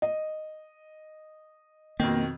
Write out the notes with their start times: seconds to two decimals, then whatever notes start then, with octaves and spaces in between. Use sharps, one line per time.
0.02 D#5
2.00 F2 B2 D#3 A#3